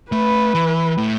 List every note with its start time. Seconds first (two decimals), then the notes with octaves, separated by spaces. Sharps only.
0.11 A3 B4
0.55 E3
0.98 A2